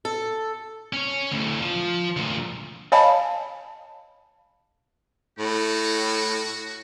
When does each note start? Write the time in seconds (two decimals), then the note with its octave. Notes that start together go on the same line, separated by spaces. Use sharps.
0.05 A4
0.93 C#4 C#5
1.32 D2 A2
1.62 F3
2.17 D2 A#2
2.92 C#5 D#5 F5 G#5 A5 B5
5.39 A2 F#4